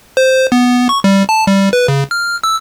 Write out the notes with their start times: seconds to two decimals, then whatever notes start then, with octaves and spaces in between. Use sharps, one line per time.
0.17 C5
0.52 B3
0.89 C#6
1.04 G3
1.29 A5
1.47 G3
1.73 B4
1.88 C#3
2.11 F6
2.44 E6